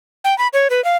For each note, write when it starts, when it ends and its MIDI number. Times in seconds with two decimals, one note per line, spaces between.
0.24 0.37 79
0.38 0.48 83
0.53 0.68 73
0.70 0.83 71
0.84 0.97 77